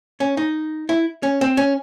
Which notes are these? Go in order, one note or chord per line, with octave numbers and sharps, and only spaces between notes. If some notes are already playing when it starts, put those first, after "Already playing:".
C#4
D#4
E4
C#4
C4
C#4